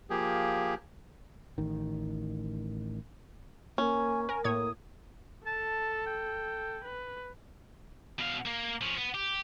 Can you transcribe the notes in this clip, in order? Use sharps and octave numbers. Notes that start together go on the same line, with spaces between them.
F3 A#3 G4 G#4
A1 D#3
A#3 C#4 G#5
A#4 G#5
A2 A#3 C#5 D#6 G#6
A4 A5
G5
B4
B2 F5
A#3
F3 C#4
B3
G4